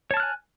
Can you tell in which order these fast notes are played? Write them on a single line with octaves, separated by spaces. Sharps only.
C#5 A5 F6 F#6 G#5